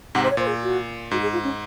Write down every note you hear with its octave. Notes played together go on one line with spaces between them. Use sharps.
G#2 C3 F#5
C5
C#5
A#2 C5
G#4
F#4
G#2 F#4
G#4
F4
C#4